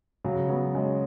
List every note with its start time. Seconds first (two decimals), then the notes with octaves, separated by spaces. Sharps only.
0.24 C#3 F#3
0.49 F#3 B3
0.75 G#3 C#4